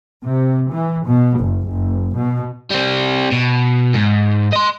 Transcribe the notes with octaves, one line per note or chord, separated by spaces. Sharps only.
C3
E3
B2
F#1
F#1
B2
G3 C4
B2
G#2
D#5 C6